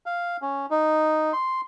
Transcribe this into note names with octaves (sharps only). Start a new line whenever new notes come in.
F5
C#4
D#4
C6